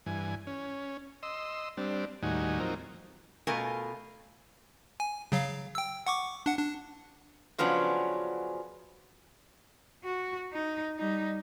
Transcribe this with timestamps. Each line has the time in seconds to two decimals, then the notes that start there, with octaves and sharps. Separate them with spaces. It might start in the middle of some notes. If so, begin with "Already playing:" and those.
0.06 G2 E3 G#5
0.47 C#4
1.23 D#5 C6 E6
1.77 G3 C4 D4
2.23 D#2 A2 G3 D#4 F#4 G#5
2.60 F3 F#3 C4 D#4 A#4
3.47 B2 A3 F4 A#4 G#5
5.00 G#5
5.32 C#3 F#3 F5
5.75 G5 E6
6.07 F#5 C#6 D6
6.46 D4 F#5
6.58 D4
7.58 C#3 F3 F#3 B3 C#4 D4
10.04 F#4
10.53 D#4
10.98 G3 D#4